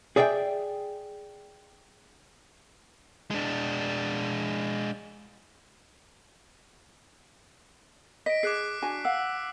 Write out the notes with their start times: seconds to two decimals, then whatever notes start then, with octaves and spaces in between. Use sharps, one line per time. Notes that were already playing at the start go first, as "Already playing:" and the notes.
0.16 G#4 D5 E5 F5 G5
3.31 G#3 D4
8.26 D#5 B6 D7
8.43 G#4 D6 F#6 C7
8.82 D4 F#4 G#5
9.05 F5 F#5 E6